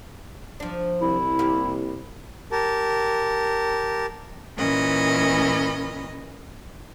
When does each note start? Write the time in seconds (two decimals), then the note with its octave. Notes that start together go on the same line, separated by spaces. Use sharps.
0.60 F3 D4
1.01 C2 E4
1.39 A#3 G4
2.52 G4 A#4 A5
4.57 A#2 E3 C#4 A#4 D#5 B5